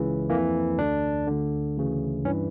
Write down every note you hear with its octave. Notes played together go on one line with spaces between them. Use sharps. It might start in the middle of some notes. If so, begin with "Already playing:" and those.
Already playing: C#2 C#3 E3
F2 E3 A#3
D2 D3 D4
D2 D3
D2 C#3 E3
G2 E3 C#4